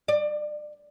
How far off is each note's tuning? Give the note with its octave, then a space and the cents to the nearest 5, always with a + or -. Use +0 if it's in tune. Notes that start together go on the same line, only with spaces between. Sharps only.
D5 +30